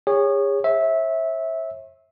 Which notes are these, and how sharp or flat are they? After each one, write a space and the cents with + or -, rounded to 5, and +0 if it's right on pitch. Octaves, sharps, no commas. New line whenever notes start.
G#4 -40 C#5 +0
C#5 -45 E5 -15